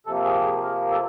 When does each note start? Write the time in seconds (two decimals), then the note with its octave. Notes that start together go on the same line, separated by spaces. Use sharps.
0.06 C3 F3 A#3 A4
0.25 G#4
0.44 G#4
0.63 A#4
0.91 A4